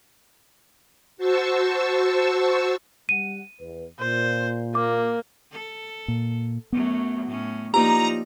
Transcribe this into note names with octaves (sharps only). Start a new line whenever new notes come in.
F#4 C5 A5 C#6 E6
G3 F#5 D#7
E2 B4
A#2 C5
A#3 D6
A4
A#2
F#2 F#3 A3 B3
A2 C#4
F3 A#3 D#4 F4 G4 D5 A#5